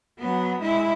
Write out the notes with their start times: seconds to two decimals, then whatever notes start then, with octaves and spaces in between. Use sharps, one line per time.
0.19 F#3 B3
0.60 G#3 E4